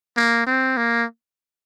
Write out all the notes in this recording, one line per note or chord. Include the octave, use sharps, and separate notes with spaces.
A#3
C4
A#3